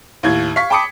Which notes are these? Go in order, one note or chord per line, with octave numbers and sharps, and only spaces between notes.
D#2 A2 G#6
F5 C#6 B6
G5 A5 B5 D6 D#6 C#7